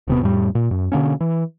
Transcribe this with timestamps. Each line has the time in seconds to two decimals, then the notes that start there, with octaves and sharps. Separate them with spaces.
0.08 D#1 C3 B3
0.21 F2 A2 G3
0.55 A#2
0.71 F#2
0.92 B2 D3 A#3 C#4
1.21 E3